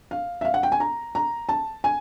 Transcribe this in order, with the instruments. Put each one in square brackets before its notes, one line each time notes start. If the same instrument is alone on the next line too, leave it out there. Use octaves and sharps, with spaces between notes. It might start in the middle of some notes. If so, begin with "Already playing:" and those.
[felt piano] F5
E5
F5
F#5
G5
G#5
A#5
A#5
A5
G#5